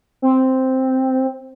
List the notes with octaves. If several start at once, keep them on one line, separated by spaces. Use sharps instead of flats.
C4